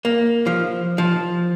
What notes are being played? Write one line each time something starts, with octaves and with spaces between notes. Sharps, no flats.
A#3
F3
F3